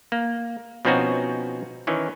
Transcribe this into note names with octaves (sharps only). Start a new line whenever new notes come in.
A#3
B2 F3 C4 C#4 D#4 F#4
D#3 E3 C#4